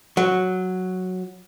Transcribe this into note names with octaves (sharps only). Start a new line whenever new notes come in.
F#3